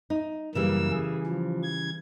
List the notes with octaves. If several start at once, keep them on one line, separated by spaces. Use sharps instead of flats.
D#4
F#2 C#3 E3 G3 A#3 E6
G#4
F3
G#6